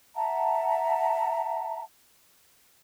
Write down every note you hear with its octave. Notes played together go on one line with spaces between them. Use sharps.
E5 F#5 A5 A#5